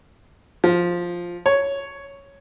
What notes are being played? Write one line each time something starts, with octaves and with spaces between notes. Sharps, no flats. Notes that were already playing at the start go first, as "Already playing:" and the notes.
F3
C#5